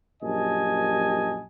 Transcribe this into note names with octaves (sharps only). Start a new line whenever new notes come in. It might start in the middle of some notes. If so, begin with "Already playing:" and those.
A#1 F#2 G4 D#5 G#5 A5